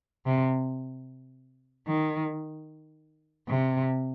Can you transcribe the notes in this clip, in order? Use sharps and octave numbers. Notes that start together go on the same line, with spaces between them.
C3
D#3
C3